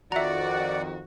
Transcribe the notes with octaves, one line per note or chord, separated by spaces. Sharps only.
F2 D#3 F#4 D5 E5 F#5 A#5